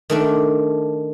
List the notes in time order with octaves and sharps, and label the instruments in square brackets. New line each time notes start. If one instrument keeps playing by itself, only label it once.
[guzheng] D#3 A3 D4